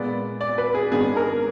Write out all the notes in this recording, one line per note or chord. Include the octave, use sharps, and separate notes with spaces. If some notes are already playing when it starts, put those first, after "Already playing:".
Already playing: A#2 G#3 B3 D5
D5
B4
G#4
G#2 D#3 G#3 B3 D4 G#4
A#4